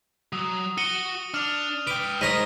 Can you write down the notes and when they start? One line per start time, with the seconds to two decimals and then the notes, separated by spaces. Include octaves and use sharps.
0.33 F#3 D#6
0.78 F#4 C#7 D#7 G7
1.34 D4 F6 F7
1.87 B4 G5 D6
2.21 G#2 D#4 A#4 C#5 D#6 A#6 B6 D#7